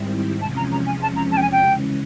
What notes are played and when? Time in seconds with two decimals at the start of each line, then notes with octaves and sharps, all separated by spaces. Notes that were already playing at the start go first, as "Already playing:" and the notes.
Already playing: G#2 D#3 G3 C4 E4
0.41 E2 C3 F3 G#3 C#4 A5
0.57 A#5
0.71 A#5
0.86 G#5
1.02 A5
1.16 A#5
1.31 A5
1.37 G5
1.42 G#5
1.52 G5
1.61 C#3 E3 G#3 C#4